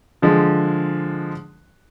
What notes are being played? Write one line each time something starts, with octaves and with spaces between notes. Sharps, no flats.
D3 F3 G#3